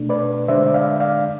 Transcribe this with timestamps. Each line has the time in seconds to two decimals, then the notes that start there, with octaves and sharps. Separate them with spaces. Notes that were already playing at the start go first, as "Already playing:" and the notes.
Already playing: B2 A3 D4
0.09 B4 D5
0.48 D3 G#3 D4 C5 E5
0.66 E5
0.74 D5 F5
1.00 D5 F5